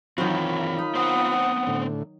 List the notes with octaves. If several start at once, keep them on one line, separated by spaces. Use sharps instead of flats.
D#3 E3 F#3 C4 F4 B5
D#4
B3 C4 C5 F#5 D#6
A2 D3